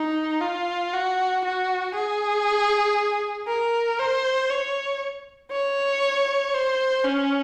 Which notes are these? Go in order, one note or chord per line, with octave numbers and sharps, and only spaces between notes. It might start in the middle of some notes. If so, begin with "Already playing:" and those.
Already playing: D#4
F4
F#4
F#4
G#4
A#4
C5
C#5
C#5
C5
C#4